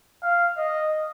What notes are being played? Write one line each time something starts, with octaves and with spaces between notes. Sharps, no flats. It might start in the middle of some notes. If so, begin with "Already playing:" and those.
F5
D#5